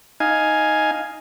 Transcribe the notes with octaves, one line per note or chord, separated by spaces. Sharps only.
D#4 F5 G#5